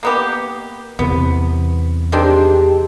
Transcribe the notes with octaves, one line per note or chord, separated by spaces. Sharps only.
A#3 B3 G4
E2 C3 B3
D#3 C4 D4 G4 G#4